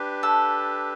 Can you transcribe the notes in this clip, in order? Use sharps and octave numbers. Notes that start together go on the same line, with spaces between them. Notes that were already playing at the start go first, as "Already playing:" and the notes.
Already playing: D4 G4 B4
A4